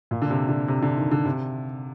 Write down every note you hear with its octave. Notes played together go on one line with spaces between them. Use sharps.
A#2
D3
C3
D3
C3
D3
D#3
D3
C3